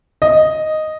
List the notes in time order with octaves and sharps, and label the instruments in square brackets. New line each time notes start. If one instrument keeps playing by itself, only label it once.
[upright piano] D#5